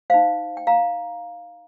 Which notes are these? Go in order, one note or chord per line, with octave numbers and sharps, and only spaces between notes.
D#4 C5 F5
G5
F5 A#5